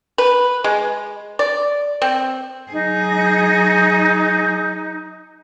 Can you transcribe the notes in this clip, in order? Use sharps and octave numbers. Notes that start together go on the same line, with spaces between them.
B4
G#3
D5
C4
F#3 D#4 G#4